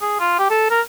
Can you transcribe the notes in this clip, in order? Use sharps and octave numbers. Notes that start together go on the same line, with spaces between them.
G#4
F4
G4
A4
A#4